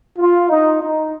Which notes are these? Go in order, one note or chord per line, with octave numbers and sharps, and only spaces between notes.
F4
D#4
D#4